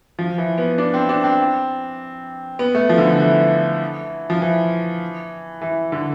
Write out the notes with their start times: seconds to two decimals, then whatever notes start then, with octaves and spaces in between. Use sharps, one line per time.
0.19 F3
0.38 E3
0.58 B3
0.78 D4
0.94 C4
1.09 D4
1.24 C4
2.59 B3
2.75 A3
2.89 F3
2.98 D3
3.05 E3
3.20 E3
4.30 F3
4.42 E3
5.61 E3
5.92 D3